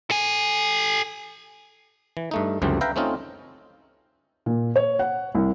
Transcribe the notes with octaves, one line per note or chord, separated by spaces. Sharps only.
A4 G#5
E3
G2 A3 D#4
C#2 F#2 D3 E3 G3 C4
B4 E5 F5 G5 A#5
A3 C4 C#4 D#4 F4
A#2
C#5
F#5
C2